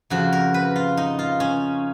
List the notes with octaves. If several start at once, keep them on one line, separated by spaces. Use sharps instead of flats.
F2 C#3 F3 F#4
A#4
B4
F4
D#4
F4
C#4